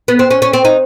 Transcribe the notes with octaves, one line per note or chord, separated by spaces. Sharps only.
B3
C4
C#4
C#4
C4
D#4